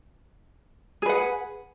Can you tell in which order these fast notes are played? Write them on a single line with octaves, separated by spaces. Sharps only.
G#4 B4 F#5